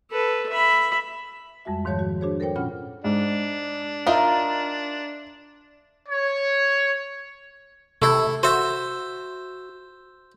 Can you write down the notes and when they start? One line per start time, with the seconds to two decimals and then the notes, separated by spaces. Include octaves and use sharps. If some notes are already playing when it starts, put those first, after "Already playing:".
0.11 A4 B4
0.50 E5 B5
1.65 F2 G3 G#3 F#4 E5
1.85 G#2 D#3 F3 C#5 A5 G6
1.99 F#4
2.21 D4 F#4 G#4 C5 C#5
2.40 A4 A#4 C5 C#5 G5
2.56 A#2 C#4 F4 F#5 B5 F6
3.04 G#2 D4
4.06 D#4 F4 A#4 E5
6.09 C#5
8.02 C3 A3 E4
8.43 F#4 C5 E5